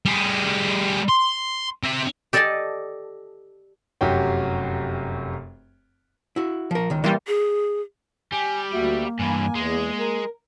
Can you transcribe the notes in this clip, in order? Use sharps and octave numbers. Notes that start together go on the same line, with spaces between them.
G3 G#4
C6
C4 E5
G4 A4 D5 D#5 G#5 A5
F1 F#2 F#4 G4 C#5 G5
E4 F#4
F3 A#4
C#2 D#3
E3 G3 A#3 A#4 C6
G#4
G3 G#5
D2 A#3 F#4 E5
G2 E3 G#5
E2 G#3
A#4